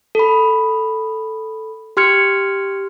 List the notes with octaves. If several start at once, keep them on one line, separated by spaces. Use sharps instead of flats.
A4 B5
G4 C6 F6 G#6 C#7